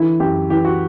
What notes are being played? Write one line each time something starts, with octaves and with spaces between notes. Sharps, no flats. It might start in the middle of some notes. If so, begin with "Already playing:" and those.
Already playing: D3 E3 E4
F#2 G4
E3 G4
F#4